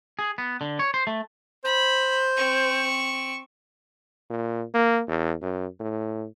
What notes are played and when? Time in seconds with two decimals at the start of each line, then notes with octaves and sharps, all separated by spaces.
0.19 G#4
0.38 B3
0.61 D3
0.79 C#5
0.94 C5
1.07 A3
1.64 C5 B5
2.36 C4 C#6
4.30 A#2
4.74 A#3
5.08 E2
5.42 F#2
5.80 A2